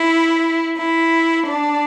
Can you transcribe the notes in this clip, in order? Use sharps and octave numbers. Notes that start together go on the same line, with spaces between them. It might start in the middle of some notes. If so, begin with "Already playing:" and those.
Already playing: E4
E4
D4